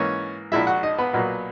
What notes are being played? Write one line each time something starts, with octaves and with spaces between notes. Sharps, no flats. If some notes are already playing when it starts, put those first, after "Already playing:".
Already playing: G#2 E3 A#3 C#4 C#5
A#1 A#2 G#3 E4 E5
F#4 F#5
D#4 D#5
B3 B4
B1 A#2 F#3 A#3